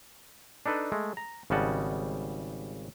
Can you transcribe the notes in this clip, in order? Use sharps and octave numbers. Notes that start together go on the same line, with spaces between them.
D4 D#4 A4 B4
G#3 A3
A#5
G#1 C#3 G3 D#5 F#5 A5